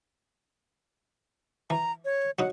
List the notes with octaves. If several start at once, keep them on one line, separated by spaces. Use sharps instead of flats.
E3 A#5
C#5
F#3 D#4 F#5